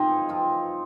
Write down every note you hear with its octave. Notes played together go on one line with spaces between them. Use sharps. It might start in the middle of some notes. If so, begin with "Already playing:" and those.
Already playing: F3 C4 D#4 F4 G#4
F3 C4 F4